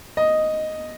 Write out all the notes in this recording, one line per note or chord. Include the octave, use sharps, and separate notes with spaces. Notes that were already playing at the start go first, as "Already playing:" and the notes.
D#5